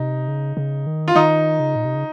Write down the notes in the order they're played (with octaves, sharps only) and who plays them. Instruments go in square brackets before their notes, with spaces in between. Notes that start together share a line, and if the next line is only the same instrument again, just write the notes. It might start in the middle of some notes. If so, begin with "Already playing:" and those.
Already playing: [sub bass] C3 [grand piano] D#4
[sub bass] C#3
C#3
D#3
[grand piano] F4
[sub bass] D#3 [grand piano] D#4
[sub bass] C#3
A#2
C3
C#3